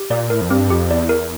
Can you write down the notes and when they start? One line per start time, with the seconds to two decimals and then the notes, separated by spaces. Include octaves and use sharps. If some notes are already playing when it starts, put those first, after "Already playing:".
Already playing: G4
0.10 A#2 D5
0.30 A2 A#4
0.41 F2
0.50 G2 C4
0.70 F2 G4
0.90 E2 D5
1.09 A#4